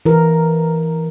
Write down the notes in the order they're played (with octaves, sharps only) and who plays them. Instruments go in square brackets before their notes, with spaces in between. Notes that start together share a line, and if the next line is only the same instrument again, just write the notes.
[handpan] E3 A#4